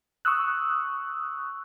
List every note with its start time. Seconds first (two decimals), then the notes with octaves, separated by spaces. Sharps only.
0.25 C#6 D#6 E6 F#6